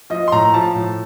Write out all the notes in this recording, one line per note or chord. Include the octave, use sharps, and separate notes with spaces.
F3 D#5
C6
A2 A#5
F3 A5
A2